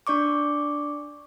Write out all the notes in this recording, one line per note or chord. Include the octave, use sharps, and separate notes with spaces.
D4 D5 C#6 D6